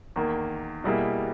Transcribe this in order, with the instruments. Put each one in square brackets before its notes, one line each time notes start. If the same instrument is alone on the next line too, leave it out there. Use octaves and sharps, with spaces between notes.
[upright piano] E2 D#3 A#3
B2 G3 A#3 E4 G#4